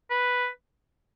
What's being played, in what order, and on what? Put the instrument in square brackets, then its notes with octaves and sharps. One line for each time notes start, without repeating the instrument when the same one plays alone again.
[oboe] B4